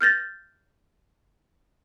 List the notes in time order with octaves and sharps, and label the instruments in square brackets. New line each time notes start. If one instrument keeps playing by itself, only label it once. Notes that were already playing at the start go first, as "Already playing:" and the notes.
[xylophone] F6 G6 A6 A#6